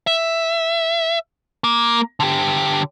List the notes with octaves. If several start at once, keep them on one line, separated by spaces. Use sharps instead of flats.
E5
A#3
D3 G4